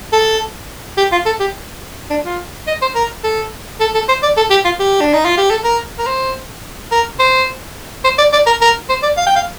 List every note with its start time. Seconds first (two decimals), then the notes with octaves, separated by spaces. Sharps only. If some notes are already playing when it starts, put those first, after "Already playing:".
0.13 A4
0.98 G4
1.12 F4
1.26 A4
1.40 G4
2.10 D4
2.25 F4
2.67 D#5
2.82 C5
2.95 A#4
3.24 A4
3.80 A4
3.94 A4
4.09 C5
4.23 D5
4.37 A4
4.51 G4
4.65 F4
4.79 G4
5.01 D4
5.13 D#4
5.25 F4
5.37 G4
5.50 A4
5.64 A#4
5.98 A#4
6.06 C5
6.92 A#4
7.19 C5
8.04 C5
8.18 D5
8.33 D5
8.46 A#4
8.61 A#4
8.89 C5
9.02 D5
9.17 F5
9.26 G5
9.36 F5